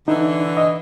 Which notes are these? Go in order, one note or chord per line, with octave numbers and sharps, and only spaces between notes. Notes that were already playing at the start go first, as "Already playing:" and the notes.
D3 E3 D#4
D#5